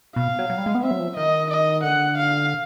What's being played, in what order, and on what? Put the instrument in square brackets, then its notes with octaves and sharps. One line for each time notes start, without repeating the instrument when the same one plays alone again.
[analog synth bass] B2 [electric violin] F5
[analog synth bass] F#3
F#3
G3
G#3
B3
[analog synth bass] C4 [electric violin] E5
[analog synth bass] F#3
F3
[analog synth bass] D#3 [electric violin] D#5
[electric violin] D#5
[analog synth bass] D3 [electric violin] F#5
[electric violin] F5